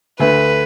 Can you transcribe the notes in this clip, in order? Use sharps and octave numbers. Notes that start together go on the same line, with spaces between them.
D2 D3 B4